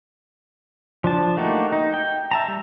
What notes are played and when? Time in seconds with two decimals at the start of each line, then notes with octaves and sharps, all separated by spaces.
1.04 F3 D4 A5
1.37 A3 A#3 D#4 F#4 G4
1.72 D#4
1.94 G5
2.31 E5 A5 A#5
2.48 G3